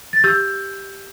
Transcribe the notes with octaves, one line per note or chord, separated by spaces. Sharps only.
A6
G4 E6 G6